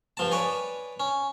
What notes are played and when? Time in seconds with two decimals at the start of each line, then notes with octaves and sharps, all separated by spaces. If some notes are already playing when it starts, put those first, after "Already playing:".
0.17 G2 F3 A5
0.32 B4 C#5 D5 G#5
1.00 C#4